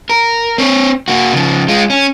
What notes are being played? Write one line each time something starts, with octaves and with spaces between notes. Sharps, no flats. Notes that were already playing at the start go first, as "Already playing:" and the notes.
A#4
C4 C#5
A#3 F#4
C#3 F3
G#3 F4
C#4